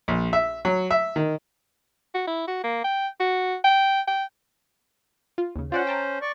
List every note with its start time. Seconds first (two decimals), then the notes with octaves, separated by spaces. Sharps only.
0.08 A#1
0.33 E5
0.65 F#3
0.91 E5
1.16 D#3
2.14 F#4
2.27 E4
2.48 F#4
2.64 A#3
2.84 G5
3.20 F#4
3.64 G5
4.08 G5
5.38 F4
5.56 D#2 C#3
5.72 C#4 F4 C5 D5 F#5
5.87 G5 A5 A#5
6.22 D5 C#6